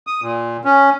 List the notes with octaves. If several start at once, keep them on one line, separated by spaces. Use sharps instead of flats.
D#6
A#2
C#4